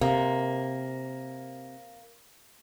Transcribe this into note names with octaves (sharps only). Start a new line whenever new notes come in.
C3 A#3